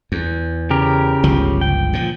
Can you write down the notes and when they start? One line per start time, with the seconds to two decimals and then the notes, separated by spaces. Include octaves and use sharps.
0.12 E2
0.70 C#3 G4 A#4
1.24 G1 C#2 F3
1.61 G5
1.93 A#2 F3